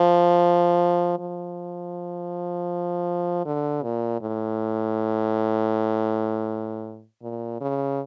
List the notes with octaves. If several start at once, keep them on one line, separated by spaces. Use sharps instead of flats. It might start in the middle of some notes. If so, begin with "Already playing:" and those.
Already playing: F3
F3
D3
A#2
A2
A#2
C#3